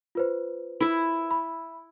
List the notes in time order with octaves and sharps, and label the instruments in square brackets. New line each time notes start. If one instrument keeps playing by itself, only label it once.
[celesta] F4 B4 C5
[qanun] E4 E5
[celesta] B5